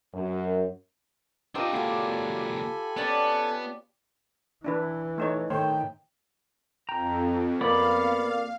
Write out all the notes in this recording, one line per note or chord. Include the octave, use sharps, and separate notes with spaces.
F#2
D4 D#4 F4 G4 C5 D#5 E6
C#2 A#3 D4 F#4 A4 G#5 B5
B3 C#4 D5 A5
E3 D4 E4 B4
A3 D#4 C#5
A2 D#3 A3 C5 C#5 G5
F2 G5 A#5
A#3 B3 D5 F5 B5